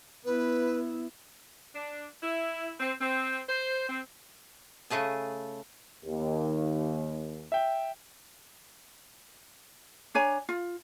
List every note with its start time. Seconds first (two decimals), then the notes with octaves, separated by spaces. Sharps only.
0.25 B3 E4 B4
1.75 D4
2.23 E4
2.80 C4
3.01 C4
3.49 C5
3.89 C4
4.90 C#3 A3 G#4 A5
6.04 D#2
7.52 E5 G5
10.14 D4 C#5 G#5 A#5
10.49 F4